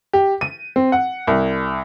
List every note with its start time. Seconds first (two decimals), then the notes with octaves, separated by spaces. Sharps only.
0.13 G4
0.41 D#7
0.76 C4
0.92 F#5
1.27 C2